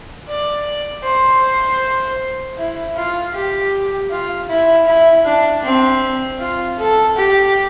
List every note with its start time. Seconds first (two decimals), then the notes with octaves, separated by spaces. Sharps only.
0.28 D5
1.04 C5
2.58 E4
2.96 F4
3.34 G4
4.10 F4
4.49 E4
4.87 E4
5.25 D4
5.64 C4
6.40 F4
6.78 A4
7.17 G4